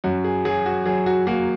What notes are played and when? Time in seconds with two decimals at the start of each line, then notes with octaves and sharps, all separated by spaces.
0.04 F#2 F#4
0.24 G#4
0.45 F#3 G#4
0.66 F#4
0.86 F#3 G#4
1.06 F#4
1.27 A#3 F#4